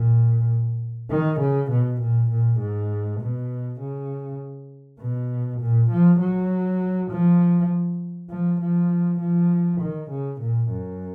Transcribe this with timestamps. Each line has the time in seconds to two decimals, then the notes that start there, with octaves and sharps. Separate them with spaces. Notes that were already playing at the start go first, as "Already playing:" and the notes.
Already playing: A#2
1.10 D#3
1.40 C#3
1.71 B2
2.01 A#2
2.30 A#2
2.60 G#2
3.21 B2
3.80 C#3
5.00 B2
5.61 A#2
5.90 F3
6.20 F#3
7.11 F3
8.30 F3
8.60 F3
9.20 F3
9.80 D#3
10.10 C#3
10.40 A#2
10.70 F#2